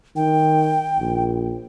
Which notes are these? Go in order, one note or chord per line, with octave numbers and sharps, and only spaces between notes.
D#3 G5
A#1